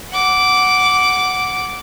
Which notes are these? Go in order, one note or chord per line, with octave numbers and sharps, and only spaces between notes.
F#5 D6